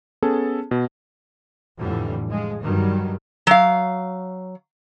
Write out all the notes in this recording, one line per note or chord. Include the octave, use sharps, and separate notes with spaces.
B3 C#4 G#4 A4 A5
B2
F2 A2 D3 E3 G3
F3 G#3
G2 D#3 F#3 G3
F#3 F5